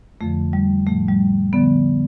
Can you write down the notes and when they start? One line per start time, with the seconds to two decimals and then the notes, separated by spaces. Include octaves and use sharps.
0.21 F2 D3 F3 A3
0.53 G3
0.87 A2 F3 A3
1.08 G3
1.53 D3 F3 B3